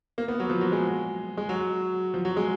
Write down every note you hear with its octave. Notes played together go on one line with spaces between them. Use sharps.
A#3
B3
F#3
F3
F#3
G#3
G#3
F#3
F3
F#3
G#3